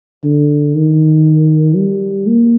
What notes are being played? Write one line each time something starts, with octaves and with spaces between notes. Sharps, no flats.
D3
D#3
G3
A#3